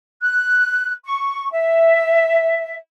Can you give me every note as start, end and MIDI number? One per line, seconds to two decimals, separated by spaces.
0.21 0.93 90
1.05 1.51 85
1.51 2.75 76